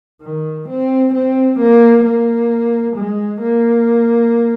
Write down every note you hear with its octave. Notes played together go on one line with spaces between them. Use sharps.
D#3
C4
C4
A#3
A#3
G#3
A#3